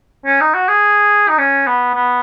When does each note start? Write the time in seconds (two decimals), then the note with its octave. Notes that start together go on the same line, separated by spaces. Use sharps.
0.26 C#4
0.41 D#4
0.54 F#4
0.69 G#4
1.29 D#4
1.39 C#4
1.67 B3
1.95 B3